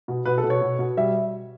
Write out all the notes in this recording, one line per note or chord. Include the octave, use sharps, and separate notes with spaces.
B2
B2 B4
A4
B2
C#5
B2
B2
G3 E5